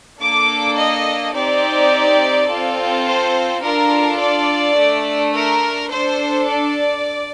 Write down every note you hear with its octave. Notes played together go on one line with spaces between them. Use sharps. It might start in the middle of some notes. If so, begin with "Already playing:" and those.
A#3 D4 A4 D6
D#5
C4 D#4 G4 D5
C4 F4 A4
C5
D4 F4 A4 A#4
D5
A3 D4 A4
A#4
D4 A4 C5
D5